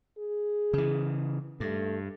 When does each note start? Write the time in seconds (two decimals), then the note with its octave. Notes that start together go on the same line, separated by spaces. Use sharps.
0.18 G#4
0.73 C#3 E3
1.60 G2 A3